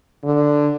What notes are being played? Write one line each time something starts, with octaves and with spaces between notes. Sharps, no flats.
D3